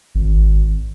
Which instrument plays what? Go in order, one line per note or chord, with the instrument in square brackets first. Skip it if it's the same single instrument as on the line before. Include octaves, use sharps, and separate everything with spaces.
[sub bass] G#1